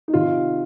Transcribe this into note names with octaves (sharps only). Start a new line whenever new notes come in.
D#4
C3 D#3 F4